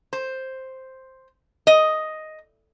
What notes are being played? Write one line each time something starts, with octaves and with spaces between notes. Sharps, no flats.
C5
D#5